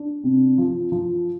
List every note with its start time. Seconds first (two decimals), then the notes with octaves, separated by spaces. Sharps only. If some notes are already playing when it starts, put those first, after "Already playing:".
Already playing: D4
0.24 C3
0.58 F3
0.92 F3